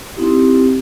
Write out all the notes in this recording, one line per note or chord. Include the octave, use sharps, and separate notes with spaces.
C4 D#4 E4 G4